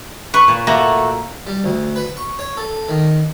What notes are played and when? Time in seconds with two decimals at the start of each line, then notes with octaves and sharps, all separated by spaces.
0.34 B4 C#6
0.48 A#2
0.67 A3 A#3 F#4 A4
1.47 G3
1.64 D2
1.96 B4
2.17 C#6
2.39 C#5
2.57 A4
2.89 D#3